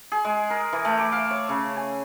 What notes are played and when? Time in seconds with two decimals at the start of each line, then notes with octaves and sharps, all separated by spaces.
0.12 G#4
0.25 G#3
0.50 A#4
0.73 E3
0.85 A3
0.99 D6
1.12 F5
1.31 C#5
1.49 C#3
1.77 G#5